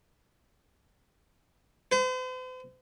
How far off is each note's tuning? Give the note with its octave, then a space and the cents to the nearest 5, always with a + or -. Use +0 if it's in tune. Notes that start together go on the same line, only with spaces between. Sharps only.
C5 -45